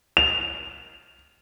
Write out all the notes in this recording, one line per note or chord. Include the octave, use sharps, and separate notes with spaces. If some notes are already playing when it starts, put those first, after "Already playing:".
F7